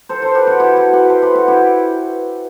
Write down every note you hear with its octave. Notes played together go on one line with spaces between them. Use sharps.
A4 C5
A4 C5
G4 B4
F#4 A4
E4 G4
F#4 A4
G4 B4
A4 C5
G4 B4
F#4 A4
E4 G4